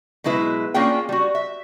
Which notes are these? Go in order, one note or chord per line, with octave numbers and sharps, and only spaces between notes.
B2 F#3 G#3 E4 B4
A#3 C#4 D4 F4 G#4 G5
G3 F#4
E5